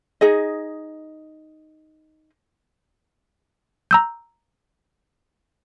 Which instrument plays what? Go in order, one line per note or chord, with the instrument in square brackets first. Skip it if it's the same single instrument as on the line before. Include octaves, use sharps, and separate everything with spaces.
[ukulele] D#4 G#4 D#5
[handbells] A#5 E6 G6